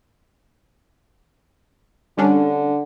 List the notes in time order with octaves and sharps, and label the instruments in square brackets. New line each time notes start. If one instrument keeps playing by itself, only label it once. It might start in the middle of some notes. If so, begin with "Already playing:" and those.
[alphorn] D3 [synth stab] G3 C#4 D4